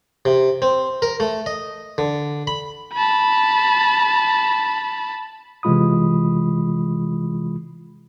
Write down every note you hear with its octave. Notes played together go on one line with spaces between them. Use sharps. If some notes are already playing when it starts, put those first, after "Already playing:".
C3
C4
A#4
A3
D#5
D3
B5
A5 B5
C3 E3 G#3 F4 B5 D#6